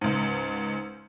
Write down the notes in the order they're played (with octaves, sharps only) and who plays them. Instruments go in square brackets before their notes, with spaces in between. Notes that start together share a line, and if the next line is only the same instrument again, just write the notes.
[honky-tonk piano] C#2 G#2